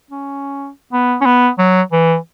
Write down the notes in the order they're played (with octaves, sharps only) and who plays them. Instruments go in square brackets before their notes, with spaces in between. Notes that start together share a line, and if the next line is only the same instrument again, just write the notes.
[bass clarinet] C#4
B3
C#4
B3
F#3
E3